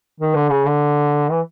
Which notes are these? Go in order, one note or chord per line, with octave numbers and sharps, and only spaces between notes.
D#3
D3
C#3
D3
E3